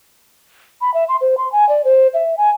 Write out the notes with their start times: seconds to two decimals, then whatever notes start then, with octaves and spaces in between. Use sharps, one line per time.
0.81 B5
0.94 E5
1.09 C6
1.21 C5
1.38 C6
1.52 G#5
1.69 D5
1.85 C5
2.14 E5
2.38 G#5